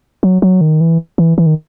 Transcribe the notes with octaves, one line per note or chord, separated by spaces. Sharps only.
F#3
F#3
D#3
E3
E3
E3
D#3